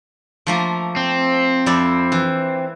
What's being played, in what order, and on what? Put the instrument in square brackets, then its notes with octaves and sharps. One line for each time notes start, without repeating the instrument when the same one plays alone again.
[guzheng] F3 A3 A#3
[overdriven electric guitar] C4
[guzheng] F2 E4 D5
E3